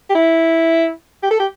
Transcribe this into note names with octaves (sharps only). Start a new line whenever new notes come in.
G4
E4
G4
A4
G4